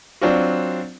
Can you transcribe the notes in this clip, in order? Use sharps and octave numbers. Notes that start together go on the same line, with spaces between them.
F#3 C4 D4 F4 F#4